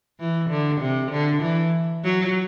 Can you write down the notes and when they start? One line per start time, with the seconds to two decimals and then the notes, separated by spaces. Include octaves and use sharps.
0.20 E3
0.50 D3
0.81 C3
1.11 D3
1.43 E3
2.04 F#3